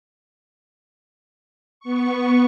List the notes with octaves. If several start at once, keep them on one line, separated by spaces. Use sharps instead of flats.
B3 C#6